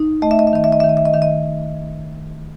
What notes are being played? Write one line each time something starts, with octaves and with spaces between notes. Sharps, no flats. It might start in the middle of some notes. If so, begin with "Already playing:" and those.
Already playing: D#4
A3 D#5
E5
D#5
E5
D#3 D#5
E5
D#5
E5
D#3
D#5
E5
D#5
D#3 E5
D#5